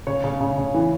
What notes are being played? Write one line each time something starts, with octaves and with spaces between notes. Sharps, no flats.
C#3 C#5
C#3
C#3
C#3
E3